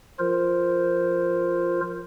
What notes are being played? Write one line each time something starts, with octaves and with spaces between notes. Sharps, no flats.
F3 F4 A#4 C5